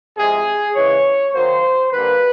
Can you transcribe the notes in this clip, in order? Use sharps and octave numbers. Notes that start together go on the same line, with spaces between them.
C3 F3 G#3 G#4
C#3 E3 G#3 C#5
D#3 F#3 A#3 C5
D3 G3 A#3 B4